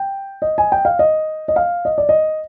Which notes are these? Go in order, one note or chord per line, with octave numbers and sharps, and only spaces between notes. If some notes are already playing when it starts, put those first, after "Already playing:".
Already playing: G5
D#5
G#5
G5
F5
D#5
D#5
F5
D#5
D5
D#5